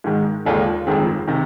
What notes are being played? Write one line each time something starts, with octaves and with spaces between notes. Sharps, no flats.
G#2 D#3 G#3
D#2 D3 G#3 D4 F4
G1 F2 D#3 G#3 C4
C3 D#3